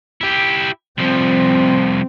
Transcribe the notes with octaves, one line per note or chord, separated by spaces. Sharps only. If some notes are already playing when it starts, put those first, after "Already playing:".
E4 G4
C2 F3 C4